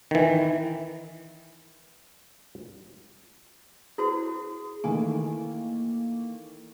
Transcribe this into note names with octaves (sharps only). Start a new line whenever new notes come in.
D#3 E3
E4 F#4 G#4 C5
D#3 E3 A3 A#3 G#5